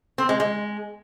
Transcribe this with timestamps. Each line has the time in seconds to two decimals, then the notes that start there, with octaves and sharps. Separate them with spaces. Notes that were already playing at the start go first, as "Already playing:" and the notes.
0.18 C4
0.29 G#3
0.40 G#3